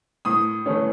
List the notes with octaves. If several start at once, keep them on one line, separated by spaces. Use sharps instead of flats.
A2 D#6
E3 A3 C#4